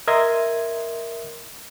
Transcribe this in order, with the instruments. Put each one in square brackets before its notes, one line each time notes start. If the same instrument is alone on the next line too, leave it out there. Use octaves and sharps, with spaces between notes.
[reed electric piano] A#4 D#5 E5 C6 D#6 G#6